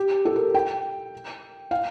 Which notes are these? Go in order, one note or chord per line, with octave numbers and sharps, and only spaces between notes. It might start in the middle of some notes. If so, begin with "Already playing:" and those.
Already playing: G4
A4
A#4
G5
F5